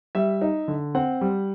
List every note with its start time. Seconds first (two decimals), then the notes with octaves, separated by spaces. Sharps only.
0.15 G3 E5
0.41 D#4
0.68 D3
0.95 C4 F#5
1.21 G3